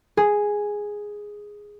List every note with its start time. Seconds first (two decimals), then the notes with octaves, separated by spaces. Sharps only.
0.17 G#4